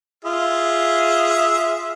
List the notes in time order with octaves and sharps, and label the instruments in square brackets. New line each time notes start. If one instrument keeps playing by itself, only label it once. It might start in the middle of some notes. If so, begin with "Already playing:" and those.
[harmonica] F4 G#4 E5